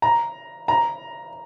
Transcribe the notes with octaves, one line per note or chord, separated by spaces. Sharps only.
A#5
A#5